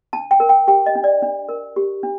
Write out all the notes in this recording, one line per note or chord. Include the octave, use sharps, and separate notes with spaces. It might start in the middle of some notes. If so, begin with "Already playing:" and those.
D4 A5
G5
A#4
G5
G4 G5
D#5
D4
D5
D4
A#4
G4
D4